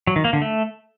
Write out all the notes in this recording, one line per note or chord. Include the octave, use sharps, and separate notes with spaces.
F#3
D#3
A#3
D3
A3